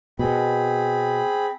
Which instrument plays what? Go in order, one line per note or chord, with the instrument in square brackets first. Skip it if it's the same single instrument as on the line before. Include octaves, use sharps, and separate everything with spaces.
[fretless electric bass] B2 [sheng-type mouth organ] C4 G#4 B5